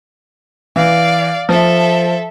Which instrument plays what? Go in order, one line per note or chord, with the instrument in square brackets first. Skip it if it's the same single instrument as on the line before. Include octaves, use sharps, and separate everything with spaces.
[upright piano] E3 [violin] D5 F5
[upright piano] F3 [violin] A4 E5